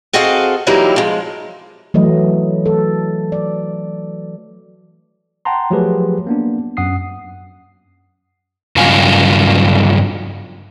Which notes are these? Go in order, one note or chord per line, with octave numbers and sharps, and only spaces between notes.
C4 F#4 G#4 A4 D#5 F5
E3 F#3 G3 A#3 D#4 E4
F3 G#3
E3 F#3 A3 D#5
A4
D5
F#5 G5 A5 A#5 C6
F3 F#3 A3 G4 G#4 B4
A#3 B3 D4
F#2 F#5 D#6 C7
G2 C#3 F#3 F4 G#5